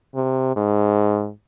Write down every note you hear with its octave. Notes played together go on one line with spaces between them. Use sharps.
C3
G#2